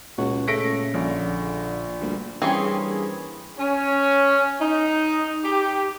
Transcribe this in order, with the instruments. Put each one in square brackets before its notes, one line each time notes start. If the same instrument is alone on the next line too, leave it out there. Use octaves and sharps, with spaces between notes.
[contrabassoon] C#2 [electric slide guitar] A#2 [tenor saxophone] F#4
[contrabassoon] C#3 [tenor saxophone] A3 [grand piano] A#6 B6 D7
[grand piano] A#1 [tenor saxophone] D3
[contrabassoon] D2 [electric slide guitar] G3 A#3
[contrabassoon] G2 [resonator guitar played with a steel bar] E3 A#3 C#4 [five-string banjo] C4 [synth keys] G#4 C#6
[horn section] C#4
D#4
G4